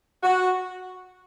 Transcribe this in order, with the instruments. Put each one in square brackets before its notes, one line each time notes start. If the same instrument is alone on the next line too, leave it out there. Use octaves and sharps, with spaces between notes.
[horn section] F#4